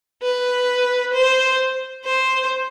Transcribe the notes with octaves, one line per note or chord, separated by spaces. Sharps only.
B4
C5
C5